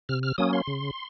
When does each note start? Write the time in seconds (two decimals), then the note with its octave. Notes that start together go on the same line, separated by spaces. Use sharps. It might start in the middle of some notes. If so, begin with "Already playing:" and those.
0.09 C3 F6
0.23 F6
0.38 F#3 A#3 C#4 D#6
0.53 C6
0.67 C#3